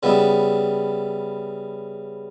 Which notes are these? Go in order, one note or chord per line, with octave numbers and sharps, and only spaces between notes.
C#3 G3 B3 E4